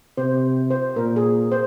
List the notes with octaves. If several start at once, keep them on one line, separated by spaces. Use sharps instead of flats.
C3 C5
C5
A#2 A#4
G#4
C5